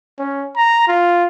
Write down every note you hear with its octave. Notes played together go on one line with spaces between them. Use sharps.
C#4
A#5
F4